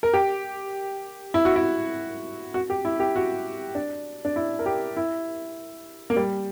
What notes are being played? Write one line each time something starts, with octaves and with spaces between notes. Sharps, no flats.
A#4
G4
E4
F#4
E4
F#4
G4
E4
G4
F#4
D4
D4
E4
A#4
G4
E4
A#3
G3